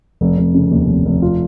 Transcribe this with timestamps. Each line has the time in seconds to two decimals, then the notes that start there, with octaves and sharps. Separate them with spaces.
0.21 F1
0.38 F1
0.54 C#3
0.71 D#2
0.88 F1
1.05 F1
1.22 F4